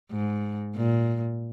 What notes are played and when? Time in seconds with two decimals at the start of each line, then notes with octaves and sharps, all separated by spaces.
0.11 G#2
0.76 A#2